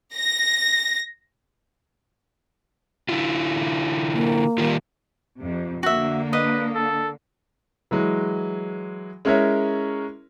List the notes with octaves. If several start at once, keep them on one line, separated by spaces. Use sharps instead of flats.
A#6
D3 E4 F4
A#3
D#3 G3 F4
F2 C3
D3 A#3 F#4 E5
B4 D#5 F5
A4
E3 F#3 G#3
G#3 C#4 E4 A#4 C#5 E5